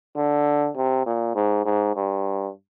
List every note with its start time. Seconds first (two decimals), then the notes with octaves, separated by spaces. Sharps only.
0.16 D3
0.76 C3
1.06 A#2
1.35 G#2
1.65 G#2
1.96 G2